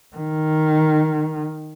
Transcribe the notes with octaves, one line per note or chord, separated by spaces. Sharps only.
D#3